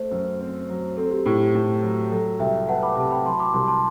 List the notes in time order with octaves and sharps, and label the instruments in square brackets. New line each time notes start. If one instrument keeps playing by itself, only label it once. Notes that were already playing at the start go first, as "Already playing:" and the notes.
Already playing: [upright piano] A3 [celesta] C5
[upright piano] F#2
C4
F#3
[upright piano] C4 [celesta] A4
[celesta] G4
[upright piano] A2 [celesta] G4
[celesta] G4
[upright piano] A2 [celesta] G4
[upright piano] F#3
[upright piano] F#3 [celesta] A4
[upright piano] C2 [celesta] E5 G5
[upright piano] B3 [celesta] F#5 A5
[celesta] B5 D6
[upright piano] C3 [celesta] A5
[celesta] G5 B5
[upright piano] F#3 [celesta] A5 C6
[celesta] B5 D6
[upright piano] C2 [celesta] A5 C6
[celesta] A5 C6